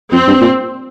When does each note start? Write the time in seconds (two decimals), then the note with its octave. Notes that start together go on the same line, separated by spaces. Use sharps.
0.12 F2 C4
0.27 G2
0.41 A#2